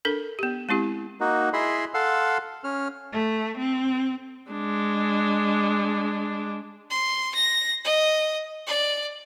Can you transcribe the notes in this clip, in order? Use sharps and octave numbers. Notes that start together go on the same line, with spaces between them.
D4 A4 A#4
B3 G4
G#3 C4 E4 G4
A#3 D#4 F#4
E4 G#4 D#5 B5 C6
A4 F5 F#5 C6 E6
C#4 F6
A3
C4
G#3 D4
C6
A#6
D#5
D5